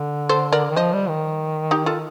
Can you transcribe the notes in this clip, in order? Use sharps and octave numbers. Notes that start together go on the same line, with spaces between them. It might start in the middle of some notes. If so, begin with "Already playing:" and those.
Already playing: D3
A4 C5
A#4 D5
D#3
F3 C5 D#5
G3
D#3
D#4 G4
F4 A4